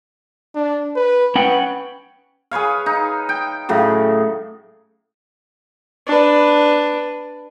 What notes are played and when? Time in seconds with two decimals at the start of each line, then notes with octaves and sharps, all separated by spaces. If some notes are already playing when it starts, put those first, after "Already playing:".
0.56 D4
0.96 B4
1.35 C#4 B4 F#5 G5
2.51 G#4 B4 C#5 F5
2.86 D#4
3.29 G5
3.69 A2 C#3 F#3
6.07 D4 B4